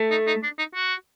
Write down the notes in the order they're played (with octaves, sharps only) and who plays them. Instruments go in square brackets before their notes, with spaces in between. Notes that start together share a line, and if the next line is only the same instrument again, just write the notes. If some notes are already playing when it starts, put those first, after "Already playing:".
Already playing: [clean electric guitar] A3
[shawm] D#4
D#4
D4
D#4
F#4